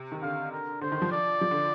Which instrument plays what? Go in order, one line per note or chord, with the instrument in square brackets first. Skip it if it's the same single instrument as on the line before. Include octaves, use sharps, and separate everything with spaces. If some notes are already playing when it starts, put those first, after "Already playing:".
Already playing: [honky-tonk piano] C3
D#3
[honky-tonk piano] D3 [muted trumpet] F5
[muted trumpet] A#4
[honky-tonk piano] D3 [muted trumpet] C5
[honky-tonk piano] D#3
F3
[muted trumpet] D5
[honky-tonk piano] F3
D3